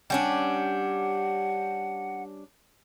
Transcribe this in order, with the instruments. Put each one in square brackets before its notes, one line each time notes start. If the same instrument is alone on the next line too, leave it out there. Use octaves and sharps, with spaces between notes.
[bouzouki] G3 C#4 D4 [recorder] F#5